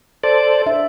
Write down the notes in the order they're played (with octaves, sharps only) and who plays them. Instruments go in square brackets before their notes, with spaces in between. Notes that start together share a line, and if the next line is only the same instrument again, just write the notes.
[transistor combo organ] A4 C5 [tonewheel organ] D5
[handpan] D4 E5